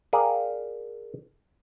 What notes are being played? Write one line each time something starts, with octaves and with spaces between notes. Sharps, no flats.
G#4 A#4 D5 F5 G5